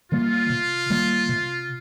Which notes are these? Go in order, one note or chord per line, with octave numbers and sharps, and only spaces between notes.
D#3 G3 A#3 F4
C3
D#3 G3 A#3
C3